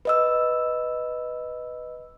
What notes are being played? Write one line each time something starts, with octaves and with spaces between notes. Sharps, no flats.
B4 D#5 E6